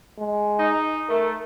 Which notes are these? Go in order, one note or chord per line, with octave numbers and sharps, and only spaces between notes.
G#3
D#4
A3 A#4